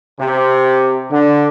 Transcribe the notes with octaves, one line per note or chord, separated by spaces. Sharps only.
C3
D3